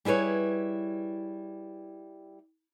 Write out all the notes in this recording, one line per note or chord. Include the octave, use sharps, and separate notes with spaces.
G3 E4 G#4 B4 C#5